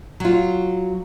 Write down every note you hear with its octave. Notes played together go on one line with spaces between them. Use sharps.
F#3 F4